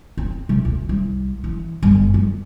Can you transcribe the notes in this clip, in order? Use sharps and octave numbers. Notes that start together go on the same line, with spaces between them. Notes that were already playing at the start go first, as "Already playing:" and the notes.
C4
C3
D2
C2
E3
G1
F2